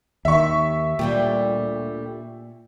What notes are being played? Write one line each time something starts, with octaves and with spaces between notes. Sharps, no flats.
D#2 D#3 E5 C#6
D2 A#2 G3 G4